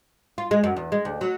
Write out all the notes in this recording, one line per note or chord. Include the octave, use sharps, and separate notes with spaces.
F4
G#3
F#2
E2
G#3
D2
F#3